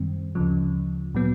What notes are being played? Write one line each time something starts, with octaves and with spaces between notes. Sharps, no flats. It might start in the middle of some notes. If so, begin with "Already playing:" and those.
Already playing: F#2 D#3 G3 C4
D2 C#3 F3
A#2 F#3 B3